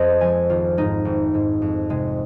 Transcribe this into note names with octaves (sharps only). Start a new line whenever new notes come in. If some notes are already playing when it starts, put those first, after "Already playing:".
Already playing: F2 C5 D#5
F3 G#3 G#5
G#1 F4
G#2 G#3 D#4
G#1
G#2 G#3
F2
C3 G#3